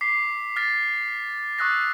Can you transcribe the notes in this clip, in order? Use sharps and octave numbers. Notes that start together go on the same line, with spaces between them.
D6 B6 C7
F6 A6 B6
C#6 D#6 E6 F#6 A6 A#6